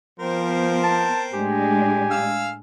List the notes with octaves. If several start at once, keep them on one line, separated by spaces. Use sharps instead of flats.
F3 B3 C4 A#4 C5
A5
A2 G#3 D4 G4 G#5
F5 E6 F6